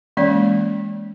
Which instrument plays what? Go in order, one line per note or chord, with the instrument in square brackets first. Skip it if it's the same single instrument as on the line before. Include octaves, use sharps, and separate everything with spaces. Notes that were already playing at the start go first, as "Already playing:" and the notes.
[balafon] E3 G#3 A#3 C#4 D5